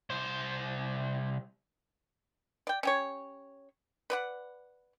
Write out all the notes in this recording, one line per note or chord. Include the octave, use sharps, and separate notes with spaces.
C2 C5
D5 G5
C#4 G4 C#5
B4 D5 F#5